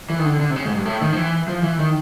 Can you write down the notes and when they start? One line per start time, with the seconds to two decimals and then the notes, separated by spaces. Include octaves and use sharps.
0.10 E3
0.19 D#3
0.25 D3
0.40 D3
0.50 C3
0.56 C#3
0.65 G#2
0.76 G2
0.86 A2
1.01 D#3
1.13 F3
1.17 E3
1.48 F3
1.63 E3
1.79 D#3